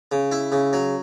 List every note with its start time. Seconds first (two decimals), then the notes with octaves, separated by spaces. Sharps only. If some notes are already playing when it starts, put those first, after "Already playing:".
0.12 C#3
0.32 E4
0.52 C#3
0.73 F#3